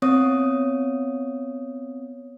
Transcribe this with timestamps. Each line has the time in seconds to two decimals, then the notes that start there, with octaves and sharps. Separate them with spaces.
0.02 B3 C4 C#5 D#6